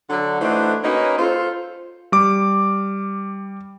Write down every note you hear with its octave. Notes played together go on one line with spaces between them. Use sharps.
D3 F#3
E3 A3 D4 D#4 F#4 C5
A#3 C#4 D#4 F#4 B4 C#5
F4 A4 C5
G3 D6